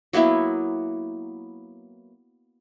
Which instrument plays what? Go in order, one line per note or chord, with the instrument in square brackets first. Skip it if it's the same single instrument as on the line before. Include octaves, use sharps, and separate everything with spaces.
[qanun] F#3 A#3 B3 E4